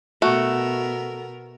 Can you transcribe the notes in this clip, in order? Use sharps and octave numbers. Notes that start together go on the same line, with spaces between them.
B2 A3 B3 F#4 A#4